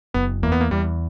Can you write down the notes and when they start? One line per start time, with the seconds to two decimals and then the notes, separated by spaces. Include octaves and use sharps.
0.14 F#1 B3
0.43 E2 A#3
0.52 B3
0.61 A#3
0.71 E2 G3